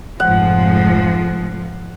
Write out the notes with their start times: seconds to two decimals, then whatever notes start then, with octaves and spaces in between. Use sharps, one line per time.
0.20 F1 G#2 F3 G#3 F#5